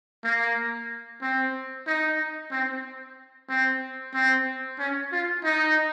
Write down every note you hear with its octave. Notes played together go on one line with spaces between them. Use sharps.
A#3
C4
D#4
C4
C4
C4
C#4
F4
D#4